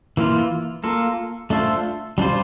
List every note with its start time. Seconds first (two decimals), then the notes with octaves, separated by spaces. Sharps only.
0.17 E3 A#3 F4
0.84 A#3 F4 A4
1.50 A3 D4 F4 A4 C5
2.18 G3 D4 F4 C5